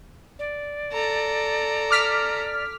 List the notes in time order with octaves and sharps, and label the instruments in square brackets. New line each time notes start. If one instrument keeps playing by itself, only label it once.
[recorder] D5
[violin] A4 A#5
[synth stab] D6 F6 B6